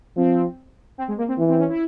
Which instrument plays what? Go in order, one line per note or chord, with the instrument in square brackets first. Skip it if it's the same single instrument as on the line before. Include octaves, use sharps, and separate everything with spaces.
[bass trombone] F3 [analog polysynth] C4
[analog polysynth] C4
G#3
A#3
C4
[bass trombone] E3
[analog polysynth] C4
C#4
E4